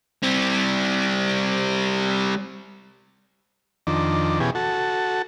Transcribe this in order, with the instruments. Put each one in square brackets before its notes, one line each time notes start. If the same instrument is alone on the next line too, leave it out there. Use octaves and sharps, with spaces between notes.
[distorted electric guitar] G3 C4
[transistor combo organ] F2 D#3 D4
B2 E3 C#4 G4 G#4
F#4 A4